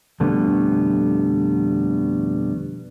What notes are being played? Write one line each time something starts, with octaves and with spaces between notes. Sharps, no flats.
F2 B2 D3 G3 A3 B3